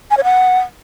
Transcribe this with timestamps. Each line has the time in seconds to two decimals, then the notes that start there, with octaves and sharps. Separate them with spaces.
0.11 G#5
0.17 C#5
0.24 F#5